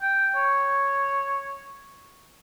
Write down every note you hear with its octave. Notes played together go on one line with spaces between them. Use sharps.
G5
C#5